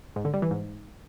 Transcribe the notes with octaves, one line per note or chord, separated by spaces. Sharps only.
G#2
D3
G3
E3
G#2